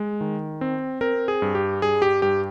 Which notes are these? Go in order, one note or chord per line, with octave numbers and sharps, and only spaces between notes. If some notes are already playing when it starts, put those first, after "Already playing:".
Already playing: G#3
D#3
C4
C4 A#4
G#4
G2
G4
G2 G#4
G4
G2 G4